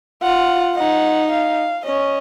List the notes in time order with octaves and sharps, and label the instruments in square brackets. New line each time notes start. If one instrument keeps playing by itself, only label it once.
[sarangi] F4 [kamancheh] F#5
[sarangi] D#4 [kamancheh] F#5
[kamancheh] F5
[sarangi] C#4 [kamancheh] D#5